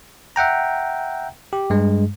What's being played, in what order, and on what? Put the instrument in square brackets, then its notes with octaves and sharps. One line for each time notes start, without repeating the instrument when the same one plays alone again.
[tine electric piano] E5 F#5 G5 A#5
G4
G2 G#3